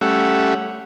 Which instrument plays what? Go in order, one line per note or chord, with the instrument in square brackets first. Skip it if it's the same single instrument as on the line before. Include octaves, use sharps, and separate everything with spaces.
[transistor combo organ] G3 A3 C#4 E5 F#5